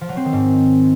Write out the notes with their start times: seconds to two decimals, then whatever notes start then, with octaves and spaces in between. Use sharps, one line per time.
0.01 F3
0.09 F#3
0.17 C4
0.25 D#3
0.33 G#2